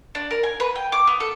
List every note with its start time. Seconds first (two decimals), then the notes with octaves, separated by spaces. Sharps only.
0.15 D4
0.31 A#4
0.44 G#5
0.60 B4
0.75 G5
0.92 D6
1.07 B3
1.20 A4